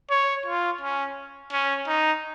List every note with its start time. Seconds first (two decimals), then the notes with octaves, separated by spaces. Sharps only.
0.10 C#5
0.46 F4
0.81 C#4
1.52 C#4
1.87 D#4